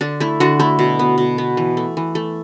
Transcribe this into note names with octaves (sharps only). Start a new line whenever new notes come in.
D3 D4
A3 E4
D3 D4 F#4
A3 E4
B2
B3
B2
B3
E3
A3
E3
A3